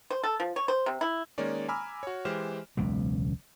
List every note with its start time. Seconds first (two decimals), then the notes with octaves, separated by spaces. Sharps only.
0.10 C5
0.23 A4
0.40 F3
0.56 C#5
0.68 C5
0.86 C3
1.01 E4
1.38 D#3 G#3 A#3 C#4 C#5 D5
1.69 G#5 A#5 B5 D6 E6 F6
2.03 F#4 C#5
2.25 E3 G#3 G4 C5 F6 E7
2.77 E1 C#2 B2 F#3